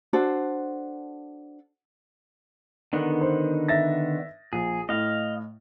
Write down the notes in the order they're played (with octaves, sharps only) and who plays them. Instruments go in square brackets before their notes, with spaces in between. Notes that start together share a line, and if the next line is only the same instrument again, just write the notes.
[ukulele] D4 F#4 A4 C5
[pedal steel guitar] D3 D#3 B3
[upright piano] C5
E5 A6 A#6
[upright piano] A#1 [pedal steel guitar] G#4
[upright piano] A2 [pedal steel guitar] D#5 F5